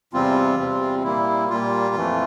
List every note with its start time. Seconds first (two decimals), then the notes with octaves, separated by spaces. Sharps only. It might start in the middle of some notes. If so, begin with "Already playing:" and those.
0.13 E2 C3 G3 C4 F4
0.58 E2 C3 G3 C4
1.03 A#2 G3 A#3 E4
1.50 A#2 G3 A#3 F4
1.95 F2 E3 A3